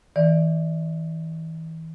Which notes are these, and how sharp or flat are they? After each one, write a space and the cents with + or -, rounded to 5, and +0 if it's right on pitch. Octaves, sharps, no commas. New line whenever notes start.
E3 -35 D5 +0